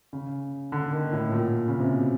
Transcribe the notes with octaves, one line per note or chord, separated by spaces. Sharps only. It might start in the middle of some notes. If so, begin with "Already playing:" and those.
C#3
D3
D#3
A2
A#2
C#3
C3
B2